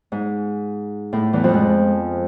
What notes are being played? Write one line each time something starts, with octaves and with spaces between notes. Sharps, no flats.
G#2
A2
E2 E3
F2 F3
G#3